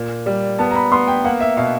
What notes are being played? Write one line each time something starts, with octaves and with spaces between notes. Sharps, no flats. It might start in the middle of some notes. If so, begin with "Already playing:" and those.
Already playing: A#2
G3
B3 A5
A#5
B5
B3 C6
G5
A#3 F#5
E5
B2 F5